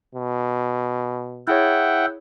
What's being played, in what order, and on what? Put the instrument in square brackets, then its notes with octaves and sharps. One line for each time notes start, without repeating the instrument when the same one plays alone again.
[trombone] B2
[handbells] E4 G#4 C#5 [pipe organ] E5 F#5 G5